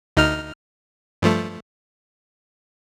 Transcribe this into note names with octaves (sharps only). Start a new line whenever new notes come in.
D2 D#4 F6
G2 F3 A3